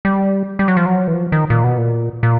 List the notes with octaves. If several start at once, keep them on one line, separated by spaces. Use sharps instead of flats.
G3
G3
F#3
F3
F#3
E3
F3
D#3
A#2
B2
A#2
A#2